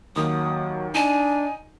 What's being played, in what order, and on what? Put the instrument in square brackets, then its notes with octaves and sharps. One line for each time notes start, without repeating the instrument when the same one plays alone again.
[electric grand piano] D#2 D#3 A#3 [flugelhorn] F#3 [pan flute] D#6
[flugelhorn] D4 [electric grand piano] D#4 [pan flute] G#5